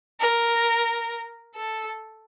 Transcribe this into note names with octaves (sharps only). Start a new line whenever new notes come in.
A#4
A4